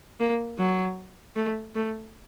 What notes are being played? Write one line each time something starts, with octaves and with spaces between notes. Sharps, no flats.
A#3
F#3
A3
A3